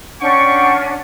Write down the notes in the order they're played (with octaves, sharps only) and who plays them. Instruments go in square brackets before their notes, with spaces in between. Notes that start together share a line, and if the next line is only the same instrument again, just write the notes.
[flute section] C#4 D4 F#5 [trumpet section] G5 C#6